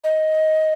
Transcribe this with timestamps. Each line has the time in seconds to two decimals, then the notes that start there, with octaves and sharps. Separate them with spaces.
0.04 D#5